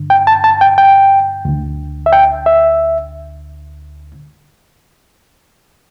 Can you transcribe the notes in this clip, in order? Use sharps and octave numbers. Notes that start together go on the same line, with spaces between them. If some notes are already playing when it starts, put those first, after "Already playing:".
Already playing: G2 D3
G5
A5
A5
G5
G5
D2 D3
E5
G5
E5